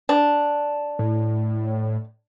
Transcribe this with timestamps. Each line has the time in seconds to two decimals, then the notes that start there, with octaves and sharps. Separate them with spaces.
0.09 D4
0.99 A2